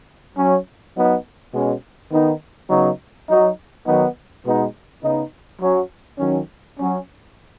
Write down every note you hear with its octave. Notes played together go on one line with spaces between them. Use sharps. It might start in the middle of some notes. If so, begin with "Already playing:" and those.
F#3 C#4
F#3 B3 D#4
B2 G#3 C#4
D#3 B3 D#4
C#3 F#3 B3 D#4
F#3 D#4
D#3 F#3 B3 D#4
B2 G#3 B3 D#4
C#3 B3 D#4
F#3 C#4
D#3 F#3 C#4
F#3 C#4